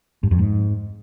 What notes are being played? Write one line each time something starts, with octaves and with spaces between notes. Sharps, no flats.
G2
F2
G#2